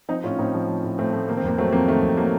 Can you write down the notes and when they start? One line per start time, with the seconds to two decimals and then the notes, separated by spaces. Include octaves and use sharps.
0.09 F3 C4 D#4
0.23 A2 C#4 F4
0.38 A2 C4 D#4
0.54 F3
0.68 F3
0.84 A2
0.99 A2 A3 C4
1.13 F3 A3
1.28 D#3 A#3
1.37 C4
1.44 F2 A#3
1.58 F#3 A3 C4
1.72 F2 A#3
1.88 D#3 A3
2.02 F2
2.17 F#3 A#3